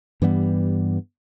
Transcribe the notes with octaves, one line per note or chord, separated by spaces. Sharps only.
G2 E3 G3 B3